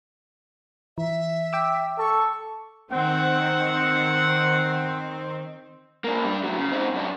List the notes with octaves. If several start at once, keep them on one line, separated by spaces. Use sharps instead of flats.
E3 E5
G5 D6 E6
A4 C#6
D#3 C4 F#5
A#3 D4
G3 D4
A2 F#3
C#3
C4 D#4
F#2 D4